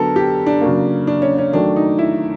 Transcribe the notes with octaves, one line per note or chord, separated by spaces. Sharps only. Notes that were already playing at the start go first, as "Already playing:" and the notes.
Already playing: D3 F#3 B3 A4 A#4
G4
D4
C#3 F#3 A#3
D4
C#4
C#4
D#3 F#3 A3 D4
D#4
E4